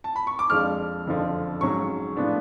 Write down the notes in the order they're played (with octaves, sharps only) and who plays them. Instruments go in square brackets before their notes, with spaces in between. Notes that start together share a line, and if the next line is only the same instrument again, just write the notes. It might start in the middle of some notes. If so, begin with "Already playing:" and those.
[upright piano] A5
B5
C#6
D6
F2 F3 G#3 D4 F6
F#1 F2 D3 F3
G#2 F#3 C#4 C#6
A2 F3 B3 D4